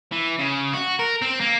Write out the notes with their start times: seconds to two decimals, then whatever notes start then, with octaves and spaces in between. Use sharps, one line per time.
0.12 E3
0.39 C#3
0.73 F#4
0.99 A#4
1.22 C4
1.41 A#3